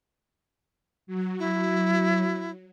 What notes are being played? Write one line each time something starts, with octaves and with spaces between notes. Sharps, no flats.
F#3
E4